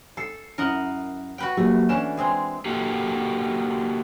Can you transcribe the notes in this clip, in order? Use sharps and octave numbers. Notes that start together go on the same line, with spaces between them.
A4 C7 C#7
F#2 E4 A#4 D#5 F#5
F#4 B4 G5
F#3 G3 A3 A#3
E3 C#4 D4 E7
G#3 C4 G#4
A#3 F#4 G4 A4